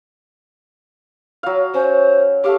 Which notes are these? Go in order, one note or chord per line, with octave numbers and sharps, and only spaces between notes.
F#3 F5
C#4 C5
A3 G4 F5 D6